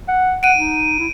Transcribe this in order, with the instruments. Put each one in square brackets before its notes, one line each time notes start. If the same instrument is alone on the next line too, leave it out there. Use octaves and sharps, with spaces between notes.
[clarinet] F#5
[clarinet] F#5 [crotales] D7 D#7
[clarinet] D#4
E4